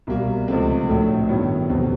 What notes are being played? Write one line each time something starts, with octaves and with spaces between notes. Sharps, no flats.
C2 B2 G3 A#3
C#2 C3 F3 A3 C4
A#1 A2 F#3 A3
G2 D#3 F#3 B3 E4
F1 E2 B2 G3 C4